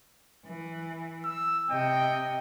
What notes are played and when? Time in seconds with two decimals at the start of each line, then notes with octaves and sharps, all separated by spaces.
0.46 E3
1.25 E6
1.70 C3 D#5 G5